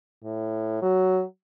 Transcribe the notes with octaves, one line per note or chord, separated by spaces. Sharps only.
A2
F#3